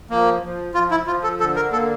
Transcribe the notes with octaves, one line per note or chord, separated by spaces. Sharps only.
F3 A#3
F3
F3 F4
E4
F3 F4
A4
D3 A4
A#4
A#3 A4